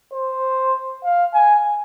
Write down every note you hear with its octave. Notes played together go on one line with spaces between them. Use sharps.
C5
F5
G#5